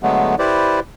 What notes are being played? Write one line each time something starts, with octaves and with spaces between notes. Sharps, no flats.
D3 F#3 G#3 A3 B3
E4 G4 B4 C5 D5